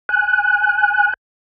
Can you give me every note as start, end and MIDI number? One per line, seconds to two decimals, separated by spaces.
0.09 1.14 80
0.09 1.14 90